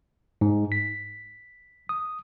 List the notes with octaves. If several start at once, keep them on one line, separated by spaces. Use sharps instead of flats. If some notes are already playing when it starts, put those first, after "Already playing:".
G#2
B6
D#6